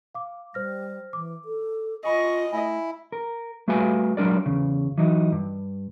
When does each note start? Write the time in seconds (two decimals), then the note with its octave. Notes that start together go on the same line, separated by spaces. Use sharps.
0.15 F5 D6
0.54 G3 C5 F6 A#6
1.13 E3 D6
1.45 A4
2.05 F4 D#5 G#5 B5 C#6
2.52 A3 E4 G#5
3.12 A#4
3.68 G3 A3 F#4 B4 F5 G#5
4.17 F#3 G#3 D4 A#4 D5
4.46 E2 C#3
4.98 E3 F#3 D#4
5.32 G2